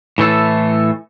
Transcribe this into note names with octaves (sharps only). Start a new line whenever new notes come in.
A2 E3 A3 A4